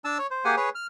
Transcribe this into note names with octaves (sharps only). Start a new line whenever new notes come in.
D4 A5 E6
C#5
C5
A#3 G4 G#4 F#5 G#5
G#4 B4 C#5
F6